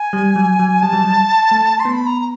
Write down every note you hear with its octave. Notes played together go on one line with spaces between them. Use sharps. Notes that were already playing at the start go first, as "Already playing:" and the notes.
Already playing: G#5
G3
F#3
F#3
G3 A5
F#3
G3
A3
C6
B3
B5
A#5
A#5